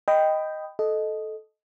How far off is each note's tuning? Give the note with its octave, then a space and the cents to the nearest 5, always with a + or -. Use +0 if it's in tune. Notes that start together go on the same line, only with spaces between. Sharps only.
D#5 +0 G5 +0 B5 +20
A4 -15 D#5 +0